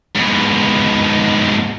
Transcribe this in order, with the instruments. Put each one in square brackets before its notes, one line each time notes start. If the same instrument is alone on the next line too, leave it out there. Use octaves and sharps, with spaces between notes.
[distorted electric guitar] G#2 B2